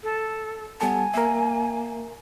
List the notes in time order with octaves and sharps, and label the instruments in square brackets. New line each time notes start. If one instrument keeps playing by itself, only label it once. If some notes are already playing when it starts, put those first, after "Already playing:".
[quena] A4
[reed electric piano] G3 A4 A5 [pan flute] B3 [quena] G#5
[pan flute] A#3 [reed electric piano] A#4 E5